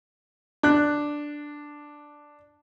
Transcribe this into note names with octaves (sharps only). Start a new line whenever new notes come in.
D4 F#6